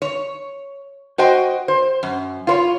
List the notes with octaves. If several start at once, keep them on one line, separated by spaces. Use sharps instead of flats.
C#5
F#4 C5 D#5 G5
C5
F#2
F4 C5 C#5